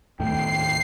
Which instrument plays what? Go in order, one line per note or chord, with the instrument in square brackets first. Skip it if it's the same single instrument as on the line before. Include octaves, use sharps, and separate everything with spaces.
[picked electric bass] D#2 A2 A3 [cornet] G5 [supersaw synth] C7